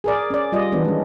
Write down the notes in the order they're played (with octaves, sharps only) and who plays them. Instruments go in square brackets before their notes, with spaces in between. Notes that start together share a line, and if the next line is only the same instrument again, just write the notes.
[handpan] G#4 A#4 D5
C#4 D5
G3 F4 D5 D#5
D#3 E3 B3 D4
G#3 C#4